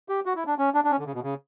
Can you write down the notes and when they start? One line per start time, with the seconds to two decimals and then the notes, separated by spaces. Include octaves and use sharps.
0.09 G4
0.26 F#4
0.36 E4
0.47 D4
0.58 C#4
0.74 D4
0.84 D4
0.91 C#4
0.98 D3
1.06 C#3
1.14 B2
1.23 C#3